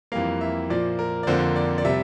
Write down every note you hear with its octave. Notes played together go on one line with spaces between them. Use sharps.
F2 E3 G3 A#3 F5
E5
A#2 F3 A#3 D5
A#4
D5
F2 D3 F3 A#3 C5
D5
D5
C3 G3 E5